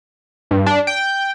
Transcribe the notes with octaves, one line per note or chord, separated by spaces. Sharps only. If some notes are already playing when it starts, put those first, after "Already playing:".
G2
D4
G5